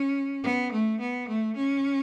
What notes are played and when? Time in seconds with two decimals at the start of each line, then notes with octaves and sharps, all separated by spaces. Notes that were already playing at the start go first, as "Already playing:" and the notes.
Already playing: C#4
0.44 B3
0.72 A3
1.00 B3
1.28 A3
1.56 C#4